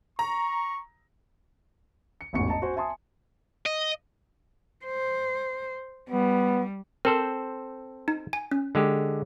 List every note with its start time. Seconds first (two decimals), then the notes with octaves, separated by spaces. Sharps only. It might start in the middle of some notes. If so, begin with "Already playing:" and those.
0.19 A#5 C#6
2.21 C#7
2.33 E1 A1 E2 G#2 C#6 C#7
2.48 D#5 A5 A#5
2.62 F#4 C5 G#5
2.76 E5 G#5 A5 C6 D#6
3.66 D#5
4.86 C5
6.10 G3 B3
7.05 C4 A4 A#4 C5
8.08 D#4
8.33 G#5
8.51 C#4
8.75 D3 G#3 G4